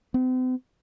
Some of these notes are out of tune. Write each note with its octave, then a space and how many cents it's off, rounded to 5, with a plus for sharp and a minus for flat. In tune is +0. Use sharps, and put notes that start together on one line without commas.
C4 -45